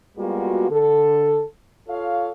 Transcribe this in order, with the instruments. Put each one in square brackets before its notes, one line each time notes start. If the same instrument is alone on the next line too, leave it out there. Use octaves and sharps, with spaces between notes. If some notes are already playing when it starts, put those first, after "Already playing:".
[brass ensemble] G3 G#3 A#3 B3 F4 F#4
D3 A4
F4 A4 C#5 F5